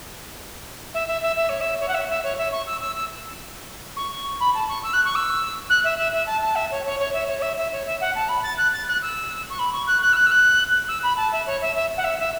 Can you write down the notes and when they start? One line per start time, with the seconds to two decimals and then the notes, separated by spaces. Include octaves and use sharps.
0.94 E5
1.07 E5
1.22 E5
1.36 E5
1.49 C#5
1.60 E5
1.80 C#5
1.88 F#5
1.94 E5
2.09 E5
2.23 C#5
2.38 E5
2.52 C#6
2.66 E6
2.80 E6
2.95 E6
3.96 C#6
4.40 B5
4.54 A5
4.68 C#6
4.83 E6
4.93 F#6
5.04 C#6
5.15 E6
5.69 F#6
5.84 E5
5.98 E5
6.13 E5
6.26 A5
6.42 A5
6.55 E5
6.71 C#5
6.85 C#5
6.99 C#5
7.13 E5
7.27 C#5
7.38 C#5
7.42 E5
7.57 E5
7.72 C#5
7.86 E5
8.01 F#5
8.15 A5
8.28 B5
8.43 A6
8.57 F#6
8.73 A6
8.87 F#6
9.01 E6
9.50 C#6
9.59 B5
9.72 C#6
9.87 F#6
10.01 F#6
10.12 E6
10.16 F#6
10.26 E6
10.31 F#6
10.88 E6
11.02 B5
11.17 A5
11.32 E5
11.46 C#5
11.61 E5
11.75 E5
11.97 F#5
12.04 E5
12.19 E5